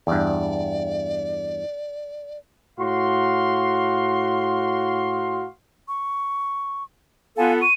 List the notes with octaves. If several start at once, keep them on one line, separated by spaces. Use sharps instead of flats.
E2 G2 D5
A2 F#4 F5 C6
C#6
B3 F4 A4 F5 G#5
C#6 D#7